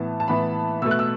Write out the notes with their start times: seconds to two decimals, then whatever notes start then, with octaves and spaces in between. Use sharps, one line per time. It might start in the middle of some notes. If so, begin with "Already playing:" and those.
Already playing: A2 E3 B3 A5
0.20 A5
0.28 A2 E3 B3 B5
0.82 B2 A3 E6
0.91 F#6
0.99 E6